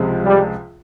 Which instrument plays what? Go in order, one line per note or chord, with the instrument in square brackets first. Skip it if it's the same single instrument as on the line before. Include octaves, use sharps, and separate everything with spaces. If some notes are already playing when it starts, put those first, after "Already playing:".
Already playing: [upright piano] C#2 C3 F3 G#3
[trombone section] G3